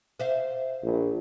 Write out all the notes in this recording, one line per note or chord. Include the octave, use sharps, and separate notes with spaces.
C5 E5 F5
A#1